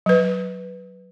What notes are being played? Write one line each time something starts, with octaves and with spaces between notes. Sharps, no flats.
F#3 B4